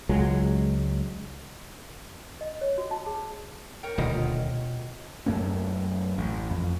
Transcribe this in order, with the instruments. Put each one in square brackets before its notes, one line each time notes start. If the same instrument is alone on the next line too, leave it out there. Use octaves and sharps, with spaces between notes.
[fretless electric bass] C#2 F#3 G#3
[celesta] D#5
C#5
F#4
A5
G#4
[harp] A#4 C#5 G5
[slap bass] D#1 D2 [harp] B2 F4 D#5
[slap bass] F#2 A3 A#3 C#4
A1
F2